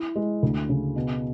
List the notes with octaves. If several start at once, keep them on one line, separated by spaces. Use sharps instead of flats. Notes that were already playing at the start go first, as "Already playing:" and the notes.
Already playing: E4
G#3
D2
C#3
B2